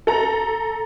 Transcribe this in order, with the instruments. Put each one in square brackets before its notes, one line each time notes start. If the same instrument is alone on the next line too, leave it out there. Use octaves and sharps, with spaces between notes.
[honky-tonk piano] A4 A#5